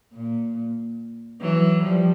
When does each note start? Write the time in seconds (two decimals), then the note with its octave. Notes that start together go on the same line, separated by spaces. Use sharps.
0.13 A#2
1.41 E3 F#3
1.84 F3 G3